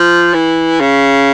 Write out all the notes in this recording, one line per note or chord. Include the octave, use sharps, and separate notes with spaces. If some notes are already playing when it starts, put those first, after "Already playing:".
Already playing: F3
E3
C#3